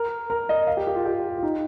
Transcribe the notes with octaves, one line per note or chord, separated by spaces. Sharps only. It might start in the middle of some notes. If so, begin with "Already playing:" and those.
Already playing: A#4
A#4
D#5
F5
G4
G4
F4
G4
F4
D#4